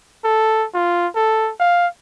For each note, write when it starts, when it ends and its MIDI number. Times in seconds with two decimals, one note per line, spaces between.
0.24 0.66 69
0.74 1.07 65
1.16 1.51 69
1.60 1.87 77